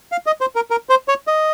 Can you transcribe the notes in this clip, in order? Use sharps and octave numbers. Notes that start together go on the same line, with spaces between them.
F5
D#5
C5
A#4
A#4
C5
C#5
D#5